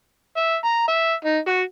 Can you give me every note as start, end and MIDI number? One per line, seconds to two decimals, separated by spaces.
0.37 0.55 76
0.64 0.84 82
0.88 1.13 76
1.24 1.38 63
1.47 1.61 66